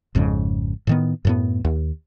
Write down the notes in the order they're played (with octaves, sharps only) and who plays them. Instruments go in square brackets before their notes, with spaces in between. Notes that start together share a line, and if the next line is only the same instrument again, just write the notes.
[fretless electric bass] G#1 F2 G#2 C#3
A2 D#3 B3
F#2 A2 B3
D#2